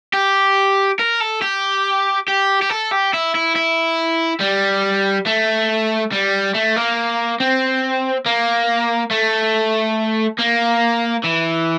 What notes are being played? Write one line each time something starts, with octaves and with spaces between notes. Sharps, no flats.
G4
A#4
A4
G4
G4
G4
A4
G4
E4
E4
E4
G3
A3
G3
A3
A#3
C4
A#3
A3
A#3
E3